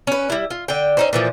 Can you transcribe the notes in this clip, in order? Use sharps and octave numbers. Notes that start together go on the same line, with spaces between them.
C#4 B4
G3 E4
F4
D3 G5
C#4 D#4 C5
A#2 E3 F3